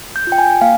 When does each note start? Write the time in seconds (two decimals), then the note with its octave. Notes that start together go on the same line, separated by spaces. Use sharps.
0.16 G6
0.27 F4
0.32 G5
0.38 G#5
0.61 A#3 F5